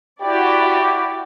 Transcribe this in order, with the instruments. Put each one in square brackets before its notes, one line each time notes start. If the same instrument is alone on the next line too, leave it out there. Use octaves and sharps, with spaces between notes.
[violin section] E4 F#4 D5 [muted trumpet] G4